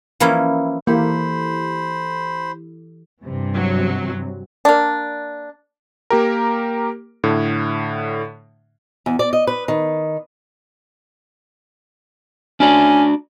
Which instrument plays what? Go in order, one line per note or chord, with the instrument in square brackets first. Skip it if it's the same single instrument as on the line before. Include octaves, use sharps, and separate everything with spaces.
[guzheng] E3 F3 A#3 C#4 E4
[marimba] E3 [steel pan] A#3 [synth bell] E4 G4 A4 [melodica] C5 B5
[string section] G2 C3 E3
[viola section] F#3
[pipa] A#3 D4
[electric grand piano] A#3 G4 A#4
A2 D3
[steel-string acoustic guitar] E2
D5
D#5
B4
D#3
[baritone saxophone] C#4 [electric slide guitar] D4 F#4 D5